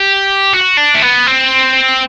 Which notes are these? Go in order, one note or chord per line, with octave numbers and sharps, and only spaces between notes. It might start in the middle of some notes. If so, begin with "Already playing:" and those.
Already playing: G4
F#4
D4
A3
B3
C4